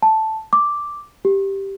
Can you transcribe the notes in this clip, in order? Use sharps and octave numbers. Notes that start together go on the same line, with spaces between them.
A5
D6
G4